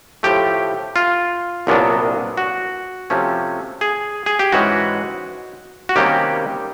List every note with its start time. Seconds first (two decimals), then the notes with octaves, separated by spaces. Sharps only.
0.23 A2 F3 A3 G4
0.96 F4
1.67 C2 A#2 F#3 B3 D4
2.37 F#4
3.10 C3 F3 A3 C#4
3.81 G#4
4.26 G#4
4.39 G4
4.52 G#2 E3 G#3 C#4 F#4
5.89 F#4
5.96 C3 D#3 G3 A#3 C#4 G4